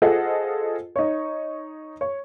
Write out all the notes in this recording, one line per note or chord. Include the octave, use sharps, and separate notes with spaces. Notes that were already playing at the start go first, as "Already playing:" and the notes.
F4 G#4 A4 C5 D#5 F#5
D#4 C#5
C#5